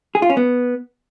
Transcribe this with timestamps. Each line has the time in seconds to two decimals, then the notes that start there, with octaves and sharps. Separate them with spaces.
0.15 G#4
0.22 F4
0.30 C#4
0.37 B3